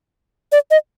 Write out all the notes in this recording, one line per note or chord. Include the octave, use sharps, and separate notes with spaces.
D5
D#5